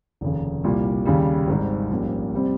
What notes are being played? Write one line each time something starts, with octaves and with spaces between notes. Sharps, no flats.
F1 D#2 C#3
C2 A#2 G3
D#2 C#3 G3
G#1 G#2 D#3 G3
A#1 G#2 G3 A#3 C#4
C3 G3 C4